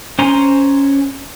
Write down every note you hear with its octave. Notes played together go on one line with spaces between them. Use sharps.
C#4 C5 G#5 A#5 C6